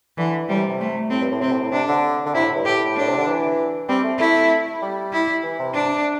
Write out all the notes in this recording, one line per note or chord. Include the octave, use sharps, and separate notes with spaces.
D3 E3
C3 G3
A2
C3
C3
A3
A2 C4
G2
A2
C3 C4
A2
A2
C3 D4
D3
D3
C3 E4
A2
G2
A2 G4
A2 D4
C3
D3
E3
G3 C4
A3
A3 E4
G3
E4
E3
C3
D4